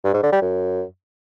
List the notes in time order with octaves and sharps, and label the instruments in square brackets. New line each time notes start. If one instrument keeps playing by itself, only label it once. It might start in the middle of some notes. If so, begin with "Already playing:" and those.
[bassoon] G2
G#2
D3
G3
F#2